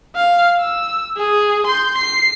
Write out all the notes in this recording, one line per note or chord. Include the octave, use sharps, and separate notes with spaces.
F5
E6
G#4
C6 G6
C7